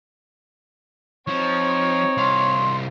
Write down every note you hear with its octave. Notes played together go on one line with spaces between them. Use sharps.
F3 C4 D#4 C#5
C2 F5 C6